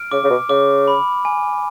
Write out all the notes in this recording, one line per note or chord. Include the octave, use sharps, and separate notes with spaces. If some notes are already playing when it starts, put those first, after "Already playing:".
Already playing: F6 D7
C#3 D6
C#3
B2
C#3 D6
B5
G#5